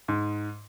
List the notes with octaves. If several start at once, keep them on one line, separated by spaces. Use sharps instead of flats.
G#2